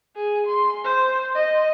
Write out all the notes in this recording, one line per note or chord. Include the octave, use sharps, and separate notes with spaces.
G#4
C6
C5
D#5